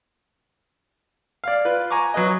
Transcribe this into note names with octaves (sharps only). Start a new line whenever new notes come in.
D5 F5
F4 B4
G#5 A#5 C#6 D6
F#3 B4 D#5